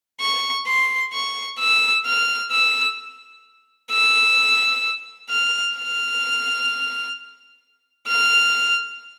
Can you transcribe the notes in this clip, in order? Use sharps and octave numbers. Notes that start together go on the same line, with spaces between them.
C#6
C6
C#6
E6
F6
E6
E6
F6
F6
F6